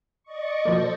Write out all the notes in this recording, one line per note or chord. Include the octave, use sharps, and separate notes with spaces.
D5 D#5 C#6
B2 F3 A#3 A4 C5